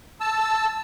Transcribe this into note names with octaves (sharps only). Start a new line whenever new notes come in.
A5 E6